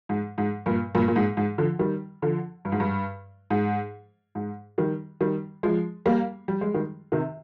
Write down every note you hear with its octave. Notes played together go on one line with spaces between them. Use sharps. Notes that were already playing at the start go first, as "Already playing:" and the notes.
G#2
G#2
G2 A#2
G2 A#2
A#2
G#2
G#2
D3 F3
D#3 G3
D3 F3
G2
G#2
G2
G#2
G#2
D#3 G3
D#3 G3
F3 G#3
G3 A#3
G3
G#3
D#3 G3
C3 D#3